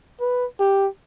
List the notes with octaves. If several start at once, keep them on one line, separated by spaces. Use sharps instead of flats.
B4
G4